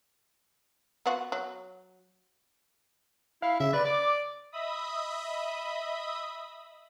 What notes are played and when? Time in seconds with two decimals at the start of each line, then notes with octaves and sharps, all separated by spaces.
1.06 B3 F4 F#4
1.32 F#3
3.42 E4 F5
3.60 C#3 E5
3.73 B4 D5
3.85 D5 D6
4.52 D#5 E5 B5 D#6